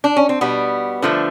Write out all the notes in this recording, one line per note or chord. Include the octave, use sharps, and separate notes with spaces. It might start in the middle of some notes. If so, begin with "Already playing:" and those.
D4
C#4
C4
B2 G3 B3
D3 F3 A3